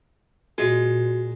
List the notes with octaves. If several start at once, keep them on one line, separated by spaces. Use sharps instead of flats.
A#2 G#3 F#4